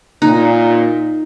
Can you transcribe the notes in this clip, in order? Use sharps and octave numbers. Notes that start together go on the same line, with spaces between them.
A#2 D#4